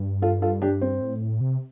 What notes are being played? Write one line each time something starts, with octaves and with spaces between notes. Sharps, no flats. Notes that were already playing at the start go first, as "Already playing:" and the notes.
Already playing: G2
F4 A4
F4 A4
D4 G4
C4
A2
C3